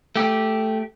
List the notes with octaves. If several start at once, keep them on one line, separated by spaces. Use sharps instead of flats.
A3 G4